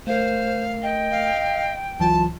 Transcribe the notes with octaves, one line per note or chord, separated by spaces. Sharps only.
A3 A#4 C5 F5
D#5 G5
F5
C#2 E3 F#3 F4 A5